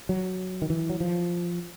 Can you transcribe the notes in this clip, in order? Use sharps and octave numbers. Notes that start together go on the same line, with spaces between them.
F#3
D#3
E3
F#3
F3